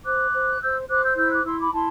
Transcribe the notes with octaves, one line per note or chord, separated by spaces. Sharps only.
C5 D6 F#6
C5
C5 E6 G6
C5 D6 F#6
E6 G6
E4 E6 G6
D6 F#6
E4 C6 E6
B5 D6
E4 A5 C6